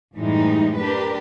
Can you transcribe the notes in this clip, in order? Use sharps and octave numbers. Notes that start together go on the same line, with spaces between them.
F#2 A2 E3 G3 G#3 D#4
D4 G4 A#4 B4